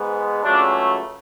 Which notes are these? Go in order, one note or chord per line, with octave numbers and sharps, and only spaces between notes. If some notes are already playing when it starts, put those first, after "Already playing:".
Already playing: G#2 G#3 B3
C#2 C#3 F#3 A3 D4